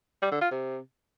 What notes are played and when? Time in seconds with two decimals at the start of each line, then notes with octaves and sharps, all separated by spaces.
0.22 G3
0.32 D3
0.41 F4
0.51 C3